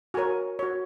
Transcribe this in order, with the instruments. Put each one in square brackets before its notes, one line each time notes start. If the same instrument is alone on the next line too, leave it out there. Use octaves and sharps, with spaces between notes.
[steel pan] F#4 A#4 C#5 G#5
F#4 C#5